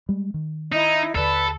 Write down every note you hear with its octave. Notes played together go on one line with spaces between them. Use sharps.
G3 G#3
D#3
D#4 E4 D#5
D#2 D3 A4 B4 D5 B5